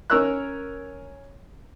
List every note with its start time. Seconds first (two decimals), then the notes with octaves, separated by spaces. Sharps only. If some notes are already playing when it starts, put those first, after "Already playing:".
0.10 C#4 A#4 C#5 E6 F#6